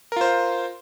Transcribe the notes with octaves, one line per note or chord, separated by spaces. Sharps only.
F4 A#4 C5